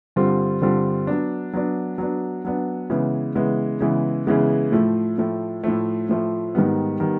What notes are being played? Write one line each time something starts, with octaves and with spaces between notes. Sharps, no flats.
G2 D3 G3 C4 F4
G2 D3 G3 C4 F4
F#3 B3 D4
F#3 B3 D4
F#3 B3 D4
F#3 B3 D4
C#3 E3 G#3 B3
C#3 E3 G#3 B3
C#3 E3 G#3 B3
C#3 E3 G#3 B3
A2 F3 A3
A2 F3 A3
A2 F3 A3
A2 F3 A3
G#2 D#3 G3 B3
D#3 G3 B3